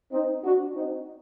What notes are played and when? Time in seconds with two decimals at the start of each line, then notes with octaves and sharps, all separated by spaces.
0.12 C4 D#4
0.43 D4 F#4
0.74 C4 D#4